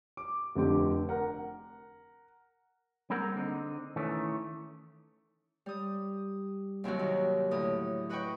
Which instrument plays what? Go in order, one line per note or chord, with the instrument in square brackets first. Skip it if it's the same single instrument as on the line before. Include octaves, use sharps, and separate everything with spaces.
[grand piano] D6
F1 D3 C4 G4 D6
A#4 F#5
[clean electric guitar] G3 A#3 C4 G#4 A#4 F#5
D3 C4 D#4
D#3 E3 A3 C#4
[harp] G3 D#6
D#2 C3 F#3 F#4
D#3
A2 D3 D#6
F#4 B4 D#5 F#5 G5 C#6